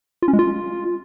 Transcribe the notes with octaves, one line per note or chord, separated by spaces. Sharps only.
F4
C#4
G#3
F4